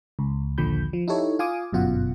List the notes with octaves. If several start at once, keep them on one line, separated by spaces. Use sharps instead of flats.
C#2
A#1 D#2 D3 F3 B5 G6
F3
D#4 E4 G4 A4 C#5
F4 F5 G#5 D6 D#6
G1 F#2 B2 F4 F#5